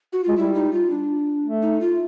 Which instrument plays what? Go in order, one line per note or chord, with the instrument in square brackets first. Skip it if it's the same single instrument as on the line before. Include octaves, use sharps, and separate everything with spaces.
[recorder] F#4
[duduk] G#3 [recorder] F4
[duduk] G3 [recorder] E4
[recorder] D#4
F4
D4
[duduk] A3
[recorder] D#4
F4